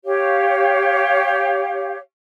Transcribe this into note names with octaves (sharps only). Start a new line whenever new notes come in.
G4 C#5 F5